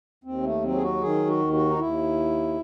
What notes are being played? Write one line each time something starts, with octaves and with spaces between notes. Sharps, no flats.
D#2 C4
A3
F#3 C4
G#4
F#4
D#3 G#4
F#4
D#2
F#4
D#4
D#2 E4